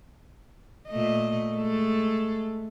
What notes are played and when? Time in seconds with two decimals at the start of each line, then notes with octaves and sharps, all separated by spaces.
0.89 A#2 A3 D#5
1.55 G#3 A3 A4